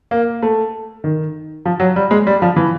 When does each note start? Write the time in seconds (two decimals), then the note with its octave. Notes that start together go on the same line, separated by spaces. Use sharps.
0.11 A#3
0.42 A3
1.04 D#3
1.65 F3
1.80 F#3
1.96 G3
2.11 G#3
2.27 G3
2.42 F3
2.56 E3